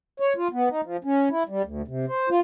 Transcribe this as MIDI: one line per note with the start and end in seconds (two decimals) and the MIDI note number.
0.20 0.33 73
0.37 0.48 65
0.53 0.69 59
0.70 0.81 63
0.85 0.97 53
1.04 1.29 61
1.31 1.43 64
1.49 1.62 55
1.64 1.82 38
1.88 2.06 48
2.08 2.29 72
2.30 2.40 65